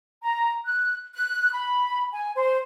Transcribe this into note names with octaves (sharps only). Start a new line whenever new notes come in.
A#5
F#6
F#6
B5
G#5
C5